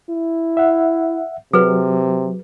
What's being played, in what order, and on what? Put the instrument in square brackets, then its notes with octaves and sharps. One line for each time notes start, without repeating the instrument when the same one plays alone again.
[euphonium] E4
[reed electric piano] E5 F#5
[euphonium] C3 [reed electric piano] F#3 [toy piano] G#4 B4